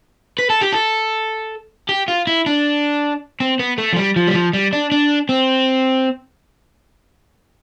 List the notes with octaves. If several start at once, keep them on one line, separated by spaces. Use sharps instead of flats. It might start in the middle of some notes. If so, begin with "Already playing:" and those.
B4
A4
G4
A4
G4
F4
E4
D4
C4
B3
A3
F3
G3
F3
G3
F3
G3
D4
D4
C4